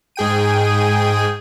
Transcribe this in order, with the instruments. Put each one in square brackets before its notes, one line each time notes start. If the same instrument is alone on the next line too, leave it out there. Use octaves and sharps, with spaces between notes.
[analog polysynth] G#2 G#4 G5 D#7